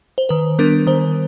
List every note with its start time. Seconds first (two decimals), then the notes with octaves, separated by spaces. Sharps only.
0.18 C5
0.29 D#3 B4
0.59 G3 B3 D4 A#4
0.87 D#3 C5